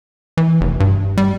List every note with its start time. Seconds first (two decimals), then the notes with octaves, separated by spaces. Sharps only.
0.37 E3
0.61 F1
0.80 G2
1.17 G3